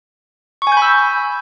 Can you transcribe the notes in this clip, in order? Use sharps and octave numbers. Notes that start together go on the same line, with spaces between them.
G#5 B5 C#6 E6 G6